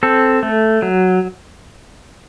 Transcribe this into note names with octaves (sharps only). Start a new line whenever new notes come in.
C4 A4
A3
F#3